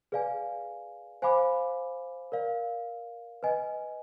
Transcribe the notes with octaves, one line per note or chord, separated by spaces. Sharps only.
G#4 B4 D5 F5 G#5
C5 F5 G#5 B5 D6
A#4 D5 F5
B4 D#5 G#5